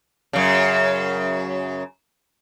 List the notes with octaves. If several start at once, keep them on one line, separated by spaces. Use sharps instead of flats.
F#2 C#3